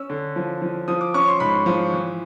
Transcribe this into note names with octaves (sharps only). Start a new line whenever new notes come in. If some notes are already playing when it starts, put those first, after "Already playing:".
Already playing: C#4 E6
D3
F3
F3
F3 D#6
D6
C#4 C#6
C6
G#2 B5
F3
E3